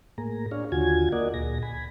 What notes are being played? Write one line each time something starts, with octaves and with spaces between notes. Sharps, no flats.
A2 A#3 G#4 A#5
D4 G#4 C#5 F5
D#2 D3 F4 F#4 G#5 G#6
A#3 A#4 D5 D#5 F#5
D2 A#2 G#4 A#6
G#5 B5